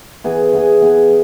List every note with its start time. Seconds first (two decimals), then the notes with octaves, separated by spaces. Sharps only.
0.24 E3 B3 G#4
0.53 E3 B3 G#4
0.81 E3 B3 G#4